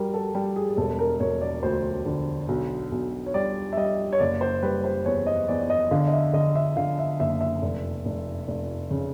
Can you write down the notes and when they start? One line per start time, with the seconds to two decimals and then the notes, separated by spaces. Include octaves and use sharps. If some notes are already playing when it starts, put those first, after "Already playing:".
Already playing: G3 F#4 A#4
0.14 A4
0.35 G3 G4
0.56 G#4
0.70 G#4
0.77 E1 A4
0.99 A#4
1.20 E1 C#5
1.42 D5
1.63 D2 C5
2.06 D3
2.48 B1
2.92 B1
3.26 C#5
3.34 G3 D5
3.73 E5
3.77 G3 D#5
4.13 C#5
4.20 F#1 D5
4.41 C5
4.62 G3 B4
4.84 C5
5.06 E2 C#5
5.26 D#5
5.48 E2 D5
5.61 D5
5.70 D#5
5.91 D3 F5
6.08 D#5
6.13 E5
6.33 D3 D#5
6.55 E5
6.77 D3 F5
6.99 E5
7.20 F#1 E5
7.41 E5
7.62 F1
8.06 F1
8.48 F1
8.91 C#3